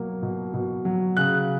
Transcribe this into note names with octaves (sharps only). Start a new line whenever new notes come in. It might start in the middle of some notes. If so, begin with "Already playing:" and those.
Already playing: B2 F#3 A#3
B2
B2
F#3
C#3 F#6